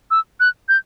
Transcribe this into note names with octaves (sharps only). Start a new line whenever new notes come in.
E6
F#6
G6